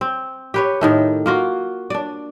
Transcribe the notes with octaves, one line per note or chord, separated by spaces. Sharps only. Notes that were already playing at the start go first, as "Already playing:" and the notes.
C4
G4 B4 C#5
A2 D#3 A3
A#3 F4 F#4
D4 D5